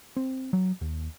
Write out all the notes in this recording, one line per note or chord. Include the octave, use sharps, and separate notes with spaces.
C4
F#3
D#2